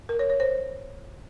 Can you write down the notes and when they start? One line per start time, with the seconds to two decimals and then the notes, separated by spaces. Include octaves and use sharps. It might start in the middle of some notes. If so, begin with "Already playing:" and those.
0.09 A#4
0.19 C#5
0.30 C#5
0.40 C5